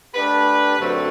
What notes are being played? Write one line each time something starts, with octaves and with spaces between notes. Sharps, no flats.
A3 D4 G4 B4
F#2 D3 F#3 A3 C4